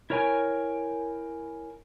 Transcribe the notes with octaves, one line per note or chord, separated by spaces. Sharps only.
E4 A#4 C#5 G5 G#5